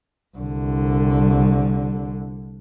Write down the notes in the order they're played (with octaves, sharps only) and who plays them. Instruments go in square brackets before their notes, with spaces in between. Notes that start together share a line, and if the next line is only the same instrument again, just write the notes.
[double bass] C2 D3